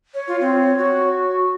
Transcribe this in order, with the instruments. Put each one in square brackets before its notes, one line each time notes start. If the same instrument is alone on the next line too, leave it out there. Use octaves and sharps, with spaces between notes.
[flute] C#5
[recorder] F4
C4
F#4